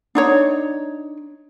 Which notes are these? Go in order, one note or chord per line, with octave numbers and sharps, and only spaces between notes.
D4 D#4 C#5